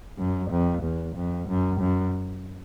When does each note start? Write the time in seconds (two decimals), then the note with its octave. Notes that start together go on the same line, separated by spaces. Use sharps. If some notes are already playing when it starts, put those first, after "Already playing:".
0.19 F#2
0.51 F2
0.83 E2
1.17 F2
1.49 F#2
1.81 F#2